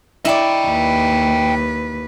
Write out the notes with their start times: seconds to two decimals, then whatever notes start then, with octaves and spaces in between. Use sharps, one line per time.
0.25 E4 D5 D#5 G5
0.68 D#2 B4